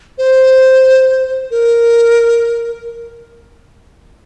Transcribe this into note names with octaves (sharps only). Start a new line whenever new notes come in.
C5
A#4